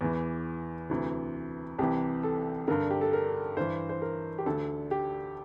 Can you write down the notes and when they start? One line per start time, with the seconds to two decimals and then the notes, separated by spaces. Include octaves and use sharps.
0.01 E2 E3
0.90 D2 C3 E3
1.79 C2 C3 E3 G4
2.23 A4
2.68 G2 D3 A#4
2.90 G4
3.01 A4
3.13 A#4
3.57 G2 E3 C5
3.89 C5
4.02 A#4
4.38 G4
4.46 D2 D3 A4
4.91 G4